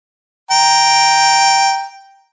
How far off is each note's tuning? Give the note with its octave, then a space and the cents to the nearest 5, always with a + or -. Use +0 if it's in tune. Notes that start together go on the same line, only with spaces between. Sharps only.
G5 +0 A#5 +0